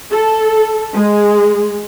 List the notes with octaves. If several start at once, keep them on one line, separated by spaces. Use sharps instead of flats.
A4
G#3